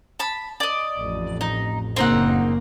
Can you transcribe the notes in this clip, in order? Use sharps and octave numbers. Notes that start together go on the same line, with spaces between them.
A5 B5
D5 D#5
A1 F2
D#4
F#1 C#3 A#3 C4 D#4 F#5